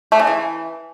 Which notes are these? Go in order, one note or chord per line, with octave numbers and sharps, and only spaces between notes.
A3
C#3
E3